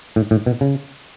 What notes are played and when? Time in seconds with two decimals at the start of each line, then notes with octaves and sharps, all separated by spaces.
0.16 A2
0.31 A2
0.46 B2
0.61 C#3